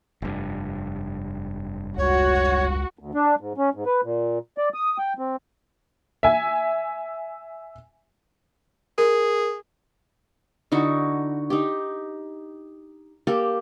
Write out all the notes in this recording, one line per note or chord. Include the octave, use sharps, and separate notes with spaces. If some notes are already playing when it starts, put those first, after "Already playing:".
F1 G2
C#2 F#4 C#5
D2
D4
G#2
C#4
G#2
B4
A#2
D5
D#6
G5
C4
E5 G#5
G#4 A#4
D3 D#4 E4 F#4
D#4 G4
A#3 G4 A4